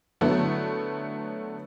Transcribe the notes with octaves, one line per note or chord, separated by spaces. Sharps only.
D3 F#3 A3 B3 E4